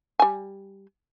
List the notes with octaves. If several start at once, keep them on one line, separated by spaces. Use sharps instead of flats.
G3 G#5